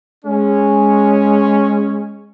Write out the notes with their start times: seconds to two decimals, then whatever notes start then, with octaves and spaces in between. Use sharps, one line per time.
0.25 G#3 C#4